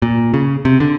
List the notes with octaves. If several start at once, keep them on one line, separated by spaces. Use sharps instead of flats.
A#2
C#3
C3
D3